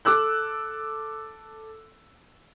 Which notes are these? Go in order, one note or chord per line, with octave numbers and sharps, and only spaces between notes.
A4 D6 E6 F#6